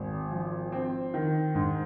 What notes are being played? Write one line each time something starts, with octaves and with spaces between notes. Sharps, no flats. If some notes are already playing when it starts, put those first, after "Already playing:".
Already playing: G#1
F3
C4
D#3
G#2